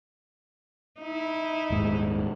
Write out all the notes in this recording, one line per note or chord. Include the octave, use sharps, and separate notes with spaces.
D#4 E4
D#1 G#2